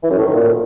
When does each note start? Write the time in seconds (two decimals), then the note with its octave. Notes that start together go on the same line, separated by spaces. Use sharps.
0.02 E3
0.10 F#2
0.18 A2
0.26 D#3
0.34 A#2